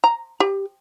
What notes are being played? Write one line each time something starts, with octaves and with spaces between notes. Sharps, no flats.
A#5
G4